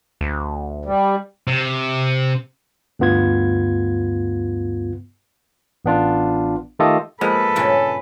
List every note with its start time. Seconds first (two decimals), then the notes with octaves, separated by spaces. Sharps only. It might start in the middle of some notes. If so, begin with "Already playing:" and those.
0.21 D2
0.85 G3
1.48 C3
2.99 D2 G2 B3 F4 G#6
5.85 A1 B3 D4 F4
6.79 D#3 A3 F4 G4 A4 D#5
7.21 F3 G#3 A#3 B3 A4 B4
7.56 G2 A#2 C#3